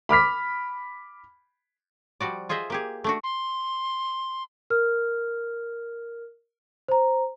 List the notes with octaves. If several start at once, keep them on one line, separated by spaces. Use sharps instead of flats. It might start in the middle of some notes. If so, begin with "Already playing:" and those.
B5 D6 F6 B6
F3 G3 F#4 D5
F4 G#4 C5 D#5 E5
A#3 G4 G#4
A3 D4 F#4
C6
A#4 F6
C5 A#5